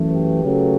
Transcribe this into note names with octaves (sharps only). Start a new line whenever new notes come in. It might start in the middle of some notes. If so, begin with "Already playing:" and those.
Already playing: F#2 E3 A3
G4 B4
C#3 F#3 A3